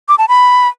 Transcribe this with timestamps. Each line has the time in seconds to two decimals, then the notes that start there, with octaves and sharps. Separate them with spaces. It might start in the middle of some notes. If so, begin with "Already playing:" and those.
0.09 D6
0.19 A5
0.29 B5